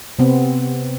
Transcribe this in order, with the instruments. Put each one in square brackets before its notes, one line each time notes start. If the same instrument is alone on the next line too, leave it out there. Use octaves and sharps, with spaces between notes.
[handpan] C3 B3 C4